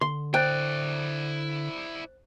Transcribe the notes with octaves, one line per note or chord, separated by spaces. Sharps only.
D3 C6
E4 C5 D5 G5 F#6 A6